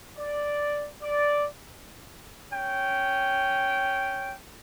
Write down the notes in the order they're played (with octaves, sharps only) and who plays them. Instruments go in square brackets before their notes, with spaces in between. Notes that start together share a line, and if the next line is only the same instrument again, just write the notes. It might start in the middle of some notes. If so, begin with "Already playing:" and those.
[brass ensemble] D5
D5
[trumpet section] C#4 G5